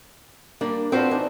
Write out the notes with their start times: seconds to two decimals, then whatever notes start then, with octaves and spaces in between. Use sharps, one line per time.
0.61 G3 A#3 D4
0.92 C4 D4 F4 F#4 B4 C5
1.11 E3 D4 D#4